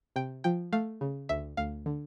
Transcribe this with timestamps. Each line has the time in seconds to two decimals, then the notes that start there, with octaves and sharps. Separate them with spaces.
0.16 C3 G5
0.44 F3 G5
0.73 A3 F5
1.01 C#3
1.29 D2 E5
1.57 D2 F5
1.86 D3